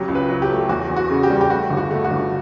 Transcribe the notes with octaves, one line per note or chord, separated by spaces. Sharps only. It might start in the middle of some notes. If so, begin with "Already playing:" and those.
Already playing: F#1 F#3 G4
C#2
B4
F#3
G4
A3
E2 F#4
E2
F#4
C#3
G4
G3
G4
A3 F#4
G1
F#4
A3
F#4
G1